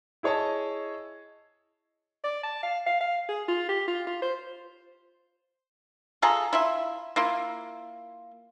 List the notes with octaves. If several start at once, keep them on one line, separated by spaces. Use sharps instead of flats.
E4 G#4 C#5 D#5 A5
D5
A5
F5
F5
F5
G#4
F4
G4
F4
F4
C5
F4 G#4 A4 A#5
E4 F4 E5
A#3 E4 F4